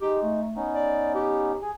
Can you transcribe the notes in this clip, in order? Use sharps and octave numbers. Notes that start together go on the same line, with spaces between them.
G#3 D#4 G4
A3
B3 C#4 D#4
D5
G4
G#4 G#5